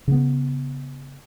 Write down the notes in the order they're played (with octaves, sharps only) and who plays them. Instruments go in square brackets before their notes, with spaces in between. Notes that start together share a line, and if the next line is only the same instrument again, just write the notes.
[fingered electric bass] C#3 B3